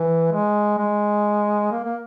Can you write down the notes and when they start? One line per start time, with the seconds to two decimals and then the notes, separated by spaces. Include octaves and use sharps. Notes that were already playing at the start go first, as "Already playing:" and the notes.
Already playing: E3
0.32 G#3
0.78 G#3
1.71 A#3
1.84 A#3